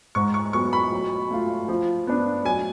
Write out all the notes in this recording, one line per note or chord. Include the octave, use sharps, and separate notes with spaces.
G#2 C#6
C#6
F#3 B3 C#6
B5
F#3
A3 F4
F3
B3 D4
F#3 G#5